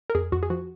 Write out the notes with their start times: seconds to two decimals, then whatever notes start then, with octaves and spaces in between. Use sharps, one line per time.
0.10 A#4
0.15 F2 G#4
0.32 F2 F#4
0.43 G#4
0.50 F3 F#4